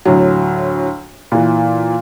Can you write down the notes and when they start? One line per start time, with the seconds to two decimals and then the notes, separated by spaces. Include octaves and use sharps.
0.05 D2 A2 F#3
1.32 A#2 E3